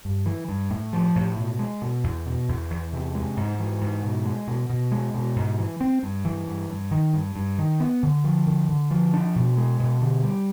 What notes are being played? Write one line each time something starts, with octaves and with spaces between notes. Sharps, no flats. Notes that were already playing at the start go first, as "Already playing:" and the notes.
G2
E3
G2
A2
F3
A2
B2
G#3
B2
E2
B2
E2
E2
C3
G#3
G#2
E3
G#2
B2
G#3
B2
B2
G#3
B2
G#2
E3
C4
G2
E3
G2
G2
D#3
G2
G2
D#3
B3
D3
F3
D3
D3
F3
D4
B2
G#3
B2
D3
G3